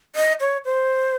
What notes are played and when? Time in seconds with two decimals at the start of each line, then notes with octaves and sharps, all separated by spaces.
0.16 D#5
0.40 C#5
0.65 C5